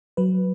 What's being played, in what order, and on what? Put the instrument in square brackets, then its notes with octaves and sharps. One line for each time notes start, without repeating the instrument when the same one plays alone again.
[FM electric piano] F#3 B4